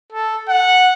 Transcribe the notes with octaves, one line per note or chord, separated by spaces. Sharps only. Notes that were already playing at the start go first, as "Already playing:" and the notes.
A4
F#5